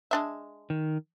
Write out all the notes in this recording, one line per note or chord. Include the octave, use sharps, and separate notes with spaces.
G#3 D4 E5
D#3